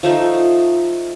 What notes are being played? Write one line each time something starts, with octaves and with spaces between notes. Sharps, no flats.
F3 A3 D#4 F4